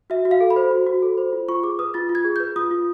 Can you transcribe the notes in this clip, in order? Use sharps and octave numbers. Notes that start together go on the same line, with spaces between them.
F#4 E5
F#4
F5
A4
B5
C5
F#4
F#4
A4
C5
F4
F4 C#6
G#4 D6
B4 D#6
F4 A6
F4
G#6
G#4
B4 G6
F4 D#6
F4